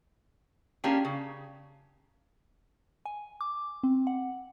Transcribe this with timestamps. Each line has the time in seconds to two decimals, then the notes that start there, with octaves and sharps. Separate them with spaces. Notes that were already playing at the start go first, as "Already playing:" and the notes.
0.84 A#3 C#4 D4 F4 G4 G#4
1.05 C#3
3.06 G#5
3.41 D6
3.83 C4
4.07 F#5